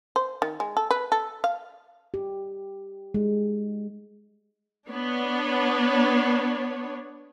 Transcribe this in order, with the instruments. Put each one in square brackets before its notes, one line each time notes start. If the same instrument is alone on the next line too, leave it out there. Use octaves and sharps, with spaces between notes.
[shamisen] C5
D#3
G#3
A4
B4
A4
F5
[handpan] G4
G#3
[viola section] B3 D4 C#5